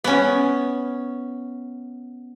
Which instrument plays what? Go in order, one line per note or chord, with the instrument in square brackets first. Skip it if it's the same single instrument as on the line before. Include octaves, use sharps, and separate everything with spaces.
[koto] B3 C#4